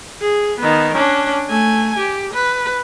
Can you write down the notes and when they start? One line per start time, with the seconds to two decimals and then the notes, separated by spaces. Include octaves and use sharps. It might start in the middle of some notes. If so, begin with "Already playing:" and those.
0.21 G#4
0.60 D#3 B3
0.95 C#4 D4
1.49 A3 G#5
1.98 G4
2.33 B4